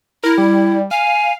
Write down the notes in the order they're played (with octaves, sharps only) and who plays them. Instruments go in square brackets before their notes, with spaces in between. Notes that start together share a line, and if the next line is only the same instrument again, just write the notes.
[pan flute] E4 [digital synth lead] A#4
[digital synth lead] G3
[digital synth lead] F5 [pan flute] G#5